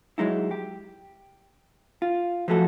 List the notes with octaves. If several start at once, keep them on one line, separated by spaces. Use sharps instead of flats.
F#3 G#3 D#4 E4
G4
F4
F3 F#3 A3 F#4 A4